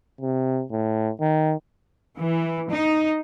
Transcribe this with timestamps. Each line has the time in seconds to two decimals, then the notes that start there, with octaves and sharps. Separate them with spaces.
0.21 C3
0.71 A2
1.21 D#3
2.17 E3
2.69 D#4